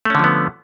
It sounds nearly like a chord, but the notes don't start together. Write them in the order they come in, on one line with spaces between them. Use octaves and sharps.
A3 C#4 D3 F3 B3